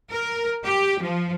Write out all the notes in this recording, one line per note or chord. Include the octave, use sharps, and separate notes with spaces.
A#4
G4
F3